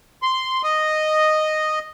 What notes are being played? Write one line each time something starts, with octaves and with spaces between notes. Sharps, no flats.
C6
D#5